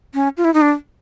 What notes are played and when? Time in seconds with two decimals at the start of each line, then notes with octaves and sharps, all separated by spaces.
0.14 C#4
0.37 F4
0.45 E4
0.54 D#4
0.61 D4